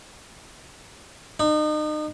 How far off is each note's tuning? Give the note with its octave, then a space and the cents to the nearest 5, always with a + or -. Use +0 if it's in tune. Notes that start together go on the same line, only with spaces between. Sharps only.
D#4 -35